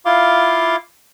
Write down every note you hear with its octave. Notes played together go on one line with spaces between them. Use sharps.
E4 F4 F5 C6 D6